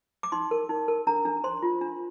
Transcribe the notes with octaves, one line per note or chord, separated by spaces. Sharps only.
D6
D#4 C6
A#4
D#4
A#4
D4 A#5
D4
C5 C6
F4
D4